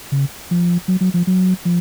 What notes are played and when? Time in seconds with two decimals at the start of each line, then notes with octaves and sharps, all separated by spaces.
0.12 C#3
0.51 F3
0.88 F#3
1.01 F#3
1.14 F3
1.27 F#3
1.65 F3